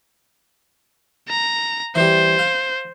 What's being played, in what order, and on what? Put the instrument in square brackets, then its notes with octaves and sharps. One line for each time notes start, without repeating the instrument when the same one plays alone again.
[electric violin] A#5
[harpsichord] E3 G3 [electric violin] C5
[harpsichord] F5